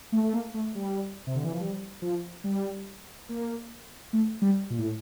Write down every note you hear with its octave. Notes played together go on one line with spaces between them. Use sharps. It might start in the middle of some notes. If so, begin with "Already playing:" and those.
A3
A3
A#3
A3
G3
C3
D3
E3
F3
G3
F3
G3
A#3
A3
G3
A#2
A2